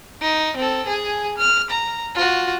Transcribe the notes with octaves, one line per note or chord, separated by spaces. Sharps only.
D#4
C4 A4
G#4 G#5
F6
A#5
F4 F#4